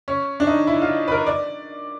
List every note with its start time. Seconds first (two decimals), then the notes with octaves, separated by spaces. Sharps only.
0.08 C#4
0.40 D4
0.47 D#4
0.67 E4
0.82 F4
1.08 B4
1.12 A#4
1.27 D5